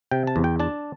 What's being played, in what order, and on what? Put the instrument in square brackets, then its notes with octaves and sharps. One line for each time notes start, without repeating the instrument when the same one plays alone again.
[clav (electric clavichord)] C3 G5
A5
E2
G5
D4 A5